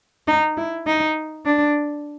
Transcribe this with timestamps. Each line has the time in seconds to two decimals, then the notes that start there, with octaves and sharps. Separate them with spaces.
0.28 D#4
0.57 E4
0.87 D#4
1.46 D4